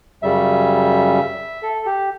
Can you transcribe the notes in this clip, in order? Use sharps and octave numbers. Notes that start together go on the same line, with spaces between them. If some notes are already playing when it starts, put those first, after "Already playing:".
F#2 C#3 G3 E5
A4
G4